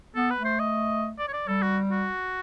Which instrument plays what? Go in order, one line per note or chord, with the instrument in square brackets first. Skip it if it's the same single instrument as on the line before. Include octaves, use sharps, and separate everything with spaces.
[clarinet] B3 [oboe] A4
[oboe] B4
[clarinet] A3
[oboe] C5
D#5
D5
C#5
D5
[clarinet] G3 [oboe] A4
[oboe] F#4
F#4